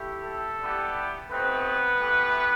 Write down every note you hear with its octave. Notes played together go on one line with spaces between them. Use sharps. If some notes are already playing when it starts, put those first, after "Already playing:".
Already playing: A3 E4 G4
A4
G3 B3 E4 G4
A3 B3 C4 D#4 G4 B4
A3 E4 G4